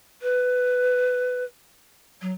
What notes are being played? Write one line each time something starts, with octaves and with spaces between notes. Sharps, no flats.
B4
F#3